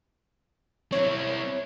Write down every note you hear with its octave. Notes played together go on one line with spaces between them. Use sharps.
C4 E4 C#5